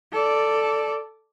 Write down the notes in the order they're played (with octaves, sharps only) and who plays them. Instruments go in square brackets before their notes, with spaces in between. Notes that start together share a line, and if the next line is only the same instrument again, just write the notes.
[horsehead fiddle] A4 D5